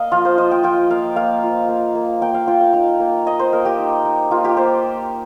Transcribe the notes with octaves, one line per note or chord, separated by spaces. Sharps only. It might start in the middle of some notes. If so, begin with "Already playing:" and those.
Already playing: A#3 D#5 F5
F3 F4
C5
F3 D#5
G5
F4 G5
A#3 F5
A#3 F5
F4
A#3
A#3
A#3 G5
F5
F4 G5
F5
D#4 F5
A#3
A#3 D#5
C5
A#3 A#4
G4
D#4
D#4
A#3 F4
G4
A#3 C5